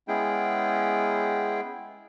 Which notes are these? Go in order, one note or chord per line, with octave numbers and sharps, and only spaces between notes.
G#3 B3 C#4 E4 G#4 G5